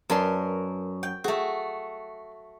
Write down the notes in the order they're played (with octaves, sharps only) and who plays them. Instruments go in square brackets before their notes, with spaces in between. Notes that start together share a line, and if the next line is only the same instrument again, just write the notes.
[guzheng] F#2 A#4 C6 [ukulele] B4 D5 A5
[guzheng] G5
[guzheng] A3 F#4 [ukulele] G#4